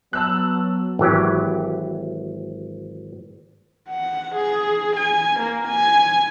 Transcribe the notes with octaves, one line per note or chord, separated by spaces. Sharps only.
F#3 B3 A5 E6 F#6
G#1 E3 F#3 G4
F#5
G#4
G#5
A#3
G#5